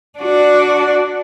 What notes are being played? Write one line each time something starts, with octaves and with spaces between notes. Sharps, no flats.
D4 F#4